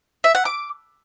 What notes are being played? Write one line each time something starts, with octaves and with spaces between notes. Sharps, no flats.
E5
F#5
D6